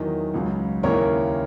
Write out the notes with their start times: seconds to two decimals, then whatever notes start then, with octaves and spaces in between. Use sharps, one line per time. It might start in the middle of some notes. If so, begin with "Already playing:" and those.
Already playing: E2 D#3 F#3 D#5
0.34 C#2 C#3 F#3
0.83 D#2 C#3 E3 A#4 C#5